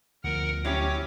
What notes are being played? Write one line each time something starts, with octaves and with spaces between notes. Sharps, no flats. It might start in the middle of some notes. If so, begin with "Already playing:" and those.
D2 F3 A#4 F#5 F6
F#3 C#4 E4 G4 C#5 D6